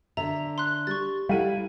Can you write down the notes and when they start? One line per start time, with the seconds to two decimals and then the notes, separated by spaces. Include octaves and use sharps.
0.17 D3 E5 A#5
0.58 C6 F#6
0.87 G3 C#6 A6
1.29 G3 E4 A4 F5 F#5 D#7